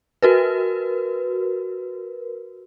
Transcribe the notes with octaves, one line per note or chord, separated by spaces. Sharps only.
F#4 A#4 B4